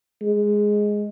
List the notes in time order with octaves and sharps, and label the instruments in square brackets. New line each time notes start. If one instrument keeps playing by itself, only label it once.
[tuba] G#3